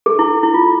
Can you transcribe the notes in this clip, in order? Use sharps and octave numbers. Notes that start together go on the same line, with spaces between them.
A4
E4
E4
F4